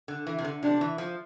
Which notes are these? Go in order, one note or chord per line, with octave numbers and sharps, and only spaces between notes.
D3
E3
C3
D3
C3 D4
E3
F3